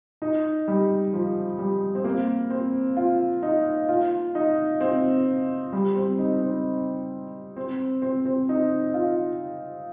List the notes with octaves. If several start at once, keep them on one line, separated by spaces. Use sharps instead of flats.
D#4
G3
F3
G3
C4
A#3
C4
F4
D#4
F4
D#4
C4
G3
C4
D#4
C4
C4
C4
C4
D#4
F4